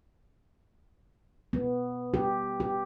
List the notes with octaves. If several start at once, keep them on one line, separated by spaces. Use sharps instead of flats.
B3
G4
G4